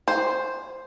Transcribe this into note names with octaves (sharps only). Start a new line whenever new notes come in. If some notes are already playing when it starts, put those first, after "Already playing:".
C5